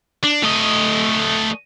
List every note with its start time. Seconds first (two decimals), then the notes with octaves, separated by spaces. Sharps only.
0.24 D4
0.43 A3 D#5